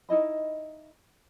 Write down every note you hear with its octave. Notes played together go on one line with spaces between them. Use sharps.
D#4 E4 D#5 B5